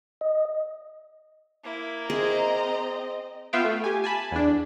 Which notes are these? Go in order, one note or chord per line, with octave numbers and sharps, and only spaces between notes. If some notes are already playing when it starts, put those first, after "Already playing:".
D#5
A#3 E4
C4 G#4 D#5 A#5
B3 F4 E5 F5 G5
A3
G4 G#5
G#5 A5 B5
E2 D4